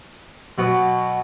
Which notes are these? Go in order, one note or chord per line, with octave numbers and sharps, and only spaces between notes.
B2 F#3 B3